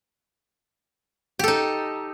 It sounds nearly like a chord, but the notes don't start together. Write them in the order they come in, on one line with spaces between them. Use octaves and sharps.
G4 A4 D#4